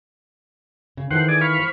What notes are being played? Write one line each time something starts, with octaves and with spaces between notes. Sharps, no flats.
C#3
D#3 E3 A4 C5 F#5
G#4 D5
F5 B5 C#6
C5